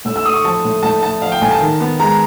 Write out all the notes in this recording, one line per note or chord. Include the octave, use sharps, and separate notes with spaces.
A2 E6
E6
A3 D#6
C#6
F3 A5
A2
A2 A5
A3 A5
F3 F5
G5
A2 G#5
A5
D#3
B3
G#3 A#5